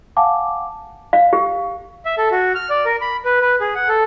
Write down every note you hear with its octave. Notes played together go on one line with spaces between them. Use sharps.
F5 F#5 G#5 A5 D6
F5
G4
E5
A4
F#4
F6
D5
A#4
B5
B4
B4
G#4
F#5
A4